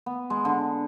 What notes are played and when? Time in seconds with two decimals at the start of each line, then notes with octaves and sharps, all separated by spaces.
0.06 B3
0.30 G#3
0.45 D3